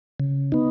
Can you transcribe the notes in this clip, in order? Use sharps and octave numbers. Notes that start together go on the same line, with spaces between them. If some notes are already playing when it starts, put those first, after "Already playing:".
C#3
B3 D#4